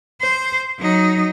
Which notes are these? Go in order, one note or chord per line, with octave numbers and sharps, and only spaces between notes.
C5
F#3 D#4